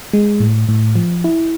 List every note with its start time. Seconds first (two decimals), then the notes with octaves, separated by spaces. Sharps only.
0.13 G#3
0.40 A2
0.69 A2
0.96 F3
1.24 E4